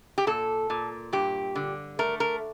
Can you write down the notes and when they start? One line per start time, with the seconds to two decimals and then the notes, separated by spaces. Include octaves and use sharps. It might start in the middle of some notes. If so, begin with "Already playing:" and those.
0.18 G4
0.27 A#2 A4
0.70 A#2
1.13 G2 G4
1.55 D3
1.99 A3 A#4
2.20 A#4